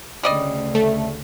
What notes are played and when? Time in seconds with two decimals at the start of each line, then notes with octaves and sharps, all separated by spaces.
0.23 D2 C#3 G3 D5 D#5
0.75 A3